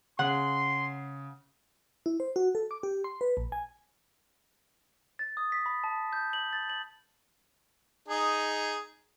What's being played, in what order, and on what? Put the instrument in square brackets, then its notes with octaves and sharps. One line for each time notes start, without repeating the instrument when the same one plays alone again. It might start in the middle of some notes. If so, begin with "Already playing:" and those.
[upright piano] C#3 [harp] F#5 [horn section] C6
[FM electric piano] E4
C5
F#4
A4
D6
G4
C6
B4
A#1
G#5
[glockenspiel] A6
D#6
B6
B5
A5
G6
F#7
A6
F#7
[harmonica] D#4 G#4